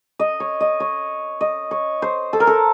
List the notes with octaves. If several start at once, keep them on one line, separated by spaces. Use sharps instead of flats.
D#5
C#5
D#5
C#5
D#5
C#5
C5
A4
A#4
A4